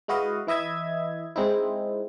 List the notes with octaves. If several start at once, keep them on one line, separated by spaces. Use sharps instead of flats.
G#3 E4 F#4 B4 D#5 F5
E3 E4 D#5 E5 G#6
G#3 C4 D#4 E4